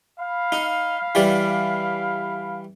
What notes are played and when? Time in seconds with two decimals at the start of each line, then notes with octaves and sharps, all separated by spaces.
0.20 F5 B5
0.52 D#4
1.15 E3 G3 D5